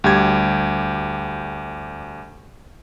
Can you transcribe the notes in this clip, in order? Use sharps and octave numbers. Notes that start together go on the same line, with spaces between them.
D2 G3 G4 G#6